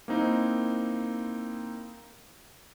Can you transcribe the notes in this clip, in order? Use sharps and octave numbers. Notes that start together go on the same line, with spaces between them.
A#3 C4 D#4 E4